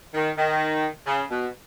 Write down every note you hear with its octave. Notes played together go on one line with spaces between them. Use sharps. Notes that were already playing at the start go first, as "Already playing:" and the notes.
D#3
D#3
C#3
B2